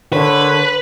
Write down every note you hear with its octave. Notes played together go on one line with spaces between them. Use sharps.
D3 A#4 B4 C#5